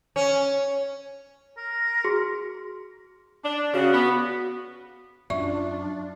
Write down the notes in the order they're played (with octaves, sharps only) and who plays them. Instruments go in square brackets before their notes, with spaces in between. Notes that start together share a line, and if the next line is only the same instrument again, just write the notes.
[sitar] C#4
[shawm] A#4
[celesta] F#4 G#4 C6
[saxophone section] D4
[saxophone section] C#3 [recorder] F#4
[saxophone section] B3
[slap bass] F#2 F#3 [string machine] D4 [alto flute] F4 [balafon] D5 E5 C#6